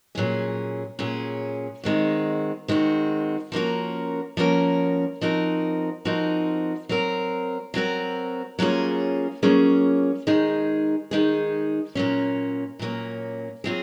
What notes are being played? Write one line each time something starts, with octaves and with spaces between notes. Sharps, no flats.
A#2 F#3 C#4 G#4
A#2 F#3 C#4 G#4
D#3 G#3 C4 F#4
D#3 G#3 C4 F#4
F3 A#3 C#4 F#4 A#4
F3 A#3 C#4 F#4 A#4
F3 C4 D#4 F#4 A#4
F3 C4 D#4 F#4 A#4
F#3 C4 F#4 A#4
F#3 C4 F#4 A#4
F#3 A#3 C#4 F4 G#4
F#3 A#3 C#4 F4 G#4
D#3 G#3 D#4 G#4
D#3 G#3 D#4 G#4
A#2 F#3 A#3 C#4
A#2 F#3 A#3 C#4
F#3 C4 F4 G#4